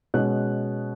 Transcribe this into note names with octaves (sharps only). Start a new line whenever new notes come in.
B2 G#3 C#4 F#6